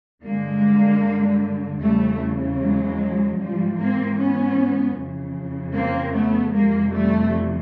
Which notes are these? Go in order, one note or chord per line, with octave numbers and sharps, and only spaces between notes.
G2 D3 G#3 A#3
E2 C#3 E3 G3 A3
F#3 G#3
G#2 E3 F3 G3
A#3 C4
B3 C#4
F2 C#3 E3
A#3 C4
A3 B3
F2 C3 E3 G#3 A#3
G3 A3